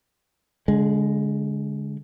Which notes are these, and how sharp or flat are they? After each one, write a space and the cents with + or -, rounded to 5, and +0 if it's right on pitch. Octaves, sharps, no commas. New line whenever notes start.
D3 -35 G#3 +0